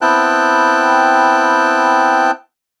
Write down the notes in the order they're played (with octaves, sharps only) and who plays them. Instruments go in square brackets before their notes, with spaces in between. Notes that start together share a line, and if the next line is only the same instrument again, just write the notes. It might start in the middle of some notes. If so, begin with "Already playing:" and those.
[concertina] B3 C4 E4 G5 A5 F#6